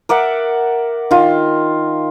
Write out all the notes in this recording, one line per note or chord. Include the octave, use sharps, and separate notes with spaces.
A#4 D5 E5 F#5
D#3 F4